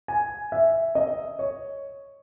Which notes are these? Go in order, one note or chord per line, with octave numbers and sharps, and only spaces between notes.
G#5
E5
D#5
C#5